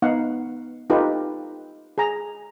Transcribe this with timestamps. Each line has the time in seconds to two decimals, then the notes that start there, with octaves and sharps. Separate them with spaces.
0.02 B3 D#4 F5 F#5
0.90 D#4 F4 G4 A4 B4
1.98 G#4 G#5 A#5